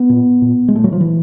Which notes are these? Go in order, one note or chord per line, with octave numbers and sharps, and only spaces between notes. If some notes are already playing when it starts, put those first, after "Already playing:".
Already playing: B3
A#2
A#2
G#3
A#2 A3
F#3
F3
E3